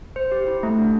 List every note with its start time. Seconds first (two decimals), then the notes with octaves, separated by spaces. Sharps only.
0.16 C5
0.32 G4
0.47 E4
0.63 A3
0.78 D4